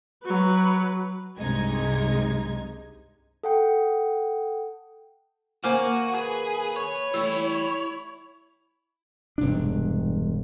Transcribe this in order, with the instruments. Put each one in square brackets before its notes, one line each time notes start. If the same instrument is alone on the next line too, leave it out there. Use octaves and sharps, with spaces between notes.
[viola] F#3 B4
[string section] C2 G2 C3 G#3 D#4 G#6
[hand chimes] A4 F#5 G5
[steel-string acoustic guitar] D#2 A#3 G#5 [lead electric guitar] F#4 [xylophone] C5 D6 F6
[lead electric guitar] G#4 [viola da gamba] B4
[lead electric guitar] C#5
[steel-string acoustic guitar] E3 G3 A3 [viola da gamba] E4 [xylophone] E6
[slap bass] E1 G2 C3 D4